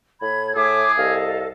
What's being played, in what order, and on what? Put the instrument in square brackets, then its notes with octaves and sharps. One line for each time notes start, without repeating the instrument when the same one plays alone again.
[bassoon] A2 [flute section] B5 G#6
[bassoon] A2 [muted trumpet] G#4 [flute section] E5 D6
[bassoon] C2 [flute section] A4 D#5 F5